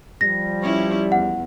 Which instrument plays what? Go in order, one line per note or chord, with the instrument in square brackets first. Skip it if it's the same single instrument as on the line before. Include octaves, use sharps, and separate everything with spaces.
[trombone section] F3 G3 [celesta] A#6
[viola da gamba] C#4 E4 C#5
[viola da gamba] E2 [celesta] F#5